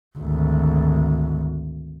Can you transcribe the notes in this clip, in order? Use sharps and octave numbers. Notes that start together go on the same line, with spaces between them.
G#1 D2